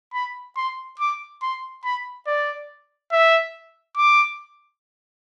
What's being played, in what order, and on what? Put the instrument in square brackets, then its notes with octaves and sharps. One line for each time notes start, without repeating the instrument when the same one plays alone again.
[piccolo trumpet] B5
C6
D6
C6
B5
D5
E5
D6